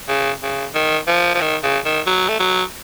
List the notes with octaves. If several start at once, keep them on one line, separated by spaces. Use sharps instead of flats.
C#3
C#3
D#3
F3
F3
D#3
C#3
D#3
F#3
A3
F#3